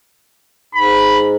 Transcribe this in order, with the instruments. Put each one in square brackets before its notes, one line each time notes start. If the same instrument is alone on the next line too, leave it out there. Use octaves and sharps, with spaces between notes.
[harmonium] G#2 [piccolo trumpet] B5